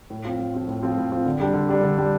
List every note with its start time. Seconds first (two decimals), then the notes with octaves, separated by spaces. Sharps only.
0.10 A2
0.25 F3 C4 F4
0.40 A2
0.54 F3 C4 F4
0.68 A2
0.83 F3 C4 F4
0.97 A2
1.12 F3 C4 F4
1.26 D3
1.40 G3 D4 G4
1.54 D3
1.69 G3 D4 G4
1.83 D3
1.98 G3 D4 G4